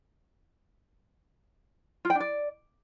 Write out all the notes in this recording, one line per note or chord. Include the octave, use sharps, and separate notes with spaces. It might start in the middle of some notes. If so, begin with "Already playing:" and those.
F4
G5
D4
D5